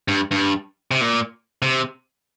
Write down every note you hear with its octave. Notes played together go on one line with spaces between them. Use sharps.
G2
G2
C3
A#2
C3